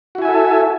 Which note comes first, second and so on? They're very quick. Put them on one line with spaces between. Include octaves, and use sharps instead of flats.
F#4 E4 G#5 E5 A4